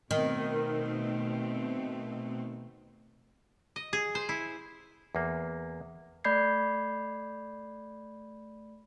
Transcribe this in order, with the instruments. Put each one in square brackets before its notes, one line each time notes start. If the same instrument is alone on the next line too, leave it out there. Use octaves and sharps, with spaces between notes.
[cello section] B2 A3 C4 [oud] D#3
[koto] D#5
G#4
C5
E4
[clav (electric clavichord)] E2 A#3
[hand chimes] A3 D5 B5 G6 G#6 C7